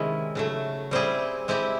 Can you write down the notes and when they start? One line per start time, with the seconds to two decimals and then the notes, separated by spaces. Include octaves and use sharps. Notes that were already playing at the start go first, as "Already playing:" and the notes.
Already playing: C3 D#3 G#3 C#4 E4
0.35 C#3 F#3 A3
0.91 G3 C4 E4 G#4
1.48 G#3 C4 E4 G4